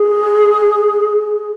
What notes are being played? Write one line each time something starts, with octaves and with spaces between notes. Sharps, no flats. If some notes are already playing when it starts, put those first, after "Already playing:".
Already playing: G#4